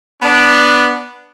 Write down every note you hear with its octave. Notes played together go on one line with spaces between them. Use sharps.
B3 D4